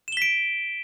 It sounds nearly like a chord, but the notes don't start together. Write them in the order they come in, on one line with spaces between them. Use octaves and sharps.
E7 G7 B6 D7